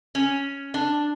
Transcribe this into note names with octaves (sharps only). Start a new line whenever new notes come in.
C#4
D4